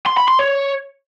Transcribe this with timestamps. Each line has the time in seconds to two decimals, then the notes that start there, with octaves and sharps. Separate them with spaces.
0.06 C6
0.17 B5
0.28 C6
0.39 C#5